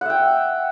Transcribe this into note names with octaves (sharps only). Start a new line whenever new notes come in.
E5 F#5 G5